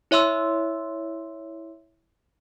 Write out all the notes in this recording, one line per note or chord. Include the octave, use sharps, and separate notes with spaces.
E4 C#5 E5 C6 E6